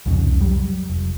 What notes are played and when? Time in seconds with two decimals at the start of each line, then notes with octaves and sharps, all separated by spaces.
0.06 C2 F2 G#2 C#3
0.41 F#3 G3
0.90 F1